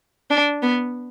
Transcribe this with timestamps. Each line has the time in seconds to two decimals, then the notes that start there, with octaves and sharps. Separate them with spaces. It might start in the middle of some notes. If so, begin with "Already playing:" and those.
0.30 D4
0.62 B3